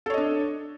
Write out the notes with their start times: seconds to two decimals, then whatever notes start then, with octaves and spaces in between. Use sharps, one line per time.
0.06 A4
0.10 C#5
0.14 D#5
0.18 D4